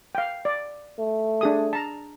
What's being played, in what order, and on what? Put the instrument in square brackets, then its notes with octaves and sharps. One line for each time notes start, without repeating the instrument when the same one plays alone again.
[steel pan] F5 G5
D5
[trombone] A3
[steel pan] D4 G#4 D#6
A5 A#5